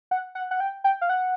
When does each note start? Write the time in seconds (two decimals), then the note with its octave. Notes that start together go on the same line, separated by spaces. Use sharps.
0.11 F#5
0.35 F#5
0.51 F#5
0.60 G5
0.84 G5
1.01 F5
1.09 F#5